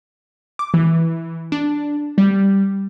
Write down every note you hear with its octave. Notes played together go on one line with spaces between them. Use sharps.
D6
E3
D4
G3